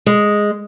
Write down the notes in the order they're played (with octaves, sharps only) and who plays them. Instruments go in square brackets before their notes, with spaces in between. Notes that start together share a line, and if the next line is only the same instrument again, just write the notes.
[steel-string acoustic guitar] G#3